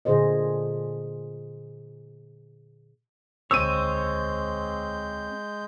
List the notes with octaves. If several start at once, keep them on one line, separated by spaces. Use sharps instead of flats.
A#2 D3 G#4 C5 D#5
E1 D2 G#3 C4 C#5 E6 G6 D#7